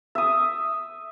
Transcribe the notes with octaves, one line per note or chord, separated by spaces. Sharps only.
E5 D#6